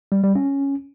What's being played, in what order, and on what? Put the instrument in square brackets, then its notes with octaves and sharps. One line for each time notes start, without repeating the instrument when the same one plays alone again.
[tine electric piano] G3
G3
C#4